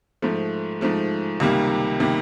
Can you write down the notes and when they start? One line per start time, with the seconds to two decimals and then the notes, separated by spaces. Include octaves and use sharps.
0.22 G#2 F3 A3
0.81 G#2 F3 A3
1.40 C#2 C3 D#3 G3 A#3
2.00 C3 D#3 G3 A#3